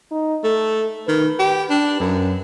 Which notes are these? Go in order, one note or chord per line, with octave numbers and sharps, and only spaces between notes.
D#4
A3 A4
D#3 B4
G4
D4
F#2